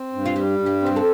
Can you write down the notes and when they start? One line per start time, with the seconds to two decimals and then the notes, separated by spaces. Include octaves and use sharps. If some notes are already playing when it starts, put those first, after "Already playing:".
Already playing: C4
0.13 G2
0.26 F4
0.36 G3 G4
0.59 G2
0.66 G4
0.82 C4 G4
0.96 A4